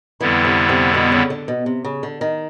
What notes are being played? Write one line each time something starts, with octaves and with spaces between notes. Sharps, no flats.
F2 D3 E3 G3 B3 E4
C3
C3
B2
C#3
D3
B2
C3
C#3
D3
D#3